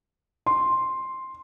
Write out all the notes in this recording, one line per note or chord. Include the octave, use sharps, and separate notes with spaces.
C6